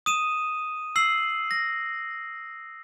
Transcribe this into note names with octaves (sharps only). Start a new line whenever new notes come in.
D#6 D#7 E7
E6 C7 F#7
A#6